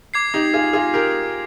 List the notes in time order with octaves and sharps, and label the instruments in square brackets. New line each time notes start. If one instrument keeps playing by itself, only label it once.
[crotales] D6 G#6 C7
[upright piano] D#4 G4
F4 G#4
F4 G#4
G4 A#4